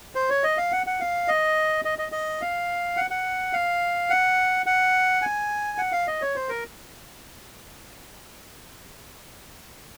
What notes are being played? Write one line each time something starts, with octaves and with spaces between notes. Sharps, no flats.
C5
C#5
D#5
F5
F#5
F#5
F5
D#5
D#5
D#5
D#5
F5
F#5
F#5
F5
F#5
F#5
G#5
F#5
F5
D#5
C#5
C5
A#4